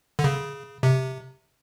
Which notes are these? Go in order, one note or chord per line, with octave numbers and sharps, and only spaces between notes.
D3
C#3
C3